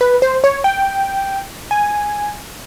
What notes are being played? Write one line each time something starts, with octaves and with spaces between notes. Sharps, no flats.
B4
C5
C#5
G5
G#5